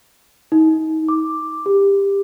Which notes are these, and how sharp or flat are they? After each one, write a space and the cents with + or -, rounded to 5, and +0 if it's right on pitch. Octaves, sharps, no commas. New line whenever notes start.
D#4 +35
D6 +5
G4 +20